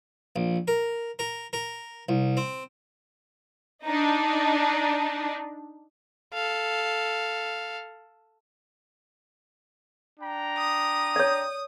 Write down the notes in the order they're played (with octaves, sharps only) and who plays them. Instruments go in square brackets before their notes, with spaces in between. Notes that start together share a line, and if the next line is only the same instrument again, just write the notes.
[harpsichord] A#1
A#4
A#4
A#4
C2
C4
[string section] D4 D#4
[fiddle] A4 F5
[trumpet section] D4 G5 A#5
[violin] D#6
[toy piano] C#5 D5